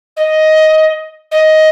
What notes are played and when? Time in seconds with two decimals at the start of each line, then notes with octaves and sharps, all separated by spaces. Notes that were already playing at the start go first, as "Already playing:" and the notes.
0.16 D#5
1.31 D#5